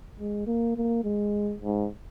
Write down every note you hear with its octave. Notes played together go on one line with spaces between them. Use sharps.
G#3
A#3
A#3
G#3
G#2